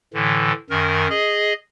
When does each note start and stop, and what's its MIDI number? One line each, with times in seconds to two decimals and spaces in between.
0.14 0.52 45
0.14 0.52 50
0.14 0.52 52
0.70 1.08 42
0.70 1.08 51
0.70 1.08 70
1.10 1.53 68
1.10 1.53 75